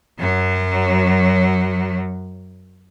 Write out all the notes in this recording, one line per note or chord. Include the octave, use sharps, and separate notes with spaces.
F#2 F#3